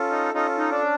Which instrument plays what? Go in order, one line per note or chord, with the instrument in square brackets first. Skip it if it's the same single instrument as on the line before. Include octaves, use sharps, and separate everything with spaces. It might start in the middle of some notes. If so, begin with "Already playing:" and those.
Already playing: [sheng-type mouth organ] C#4 F4 A4
[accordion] D#4
[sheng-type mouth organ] C#4 F4 A4 [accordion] D#4
[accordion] D#4
D4
[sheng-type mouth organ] C#4